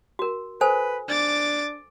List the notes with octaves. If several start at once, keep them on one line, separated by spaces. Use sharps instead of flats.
F#4 A#4
A4 B4 C5 G#5
D4 D6 A6